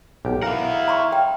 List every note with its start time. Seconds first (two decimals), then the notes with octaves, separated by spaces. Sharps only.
0.25 B1 G4
0.42 E4 A#4 F5 F#5
0.88 A#5 C6 C#6
1.12 G5